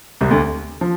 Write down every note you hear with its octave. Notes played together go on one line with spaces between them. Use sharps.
C2 C3
D2 D3
F3